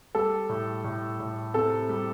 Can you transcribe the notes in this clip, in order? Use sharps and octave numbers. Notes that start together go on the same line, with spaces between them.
G3 A4
A2
A2
A2
C3 A4
G3